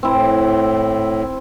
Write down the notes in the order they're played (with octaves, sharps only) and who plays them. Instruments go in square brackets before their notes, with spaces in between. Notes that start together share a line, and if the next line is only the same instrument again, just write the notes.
[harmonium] A2 [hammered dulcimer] C4 E4